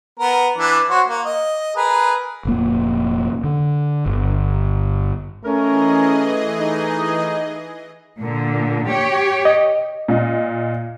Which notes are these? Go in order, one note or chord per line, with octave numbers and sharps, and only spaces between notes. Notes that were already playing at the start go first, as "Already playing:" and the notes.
B3 A#4
E3 D4 D5
F#4 C5 C#5
A#3
D#5
G#4 A#4 B4
F1 A#2 A#3
D3
G1
E3 A3 C#4 G#4 A#4 D#5
D#4
A#2 D3
G4 C#5
D#5
A#2 D#5